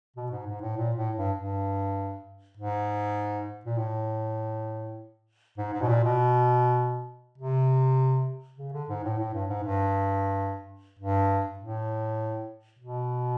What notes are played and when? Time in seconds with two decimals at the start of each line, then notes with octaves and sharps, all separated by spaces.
0.17 B2
0.31 G#2
0.47 G#2
0.62 A2
0.77 A#2
0.97 A2
1.17 G2
1.37 G2
2.57 G#2
3.65 A#2
3.78 A2
5.58 G#2
5.73 G#2
5.82 B2
5.88 A#2
6.03 B2
7.38 C3
8.58 C#3
8.73 D3
8.89 G#2
9.04 A2
9.18 A2
9.33 G2
9.49 G#2
9.63 G2
10.99 G2
11.59 A2
12.79 B2